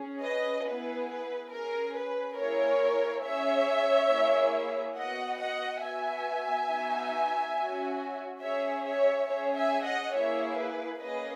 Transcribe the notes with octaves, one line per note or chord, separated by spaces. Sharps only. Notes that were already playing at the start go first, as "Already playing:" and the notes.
Already playing: C#4 G#4
B4 D#5
B3 E4 G#4 B4
B4
C#4 G#4 A#4
B4
A#3 E4 G#4 A#4 C#5
C#4 G#4 C#5 E5
A#3 E4 G#4
B3 F#4 D#5 F#5
D#5 F#5
B3 F#4 E5 G#5
B3 D#4 F#4
C#4 F#4
C#4 G#4 C#5 E5
C#5 E5
C#4 G#4 C#5 E5
E5 G#5
D#5 F#5
A#3 E4 G#4 C#5 E5
B4
A#3 C#4 G#4 B4 D#5